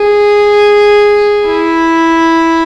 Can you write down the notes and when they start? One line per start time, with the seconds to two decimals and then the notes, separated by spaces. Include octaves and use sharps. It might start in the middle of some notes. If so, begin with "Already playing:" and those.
Already playing: G#4
1.46 E4